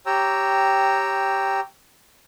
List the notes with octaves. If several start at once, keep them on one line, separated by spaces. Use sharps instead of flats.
G4 C#5 G5 A#5 E6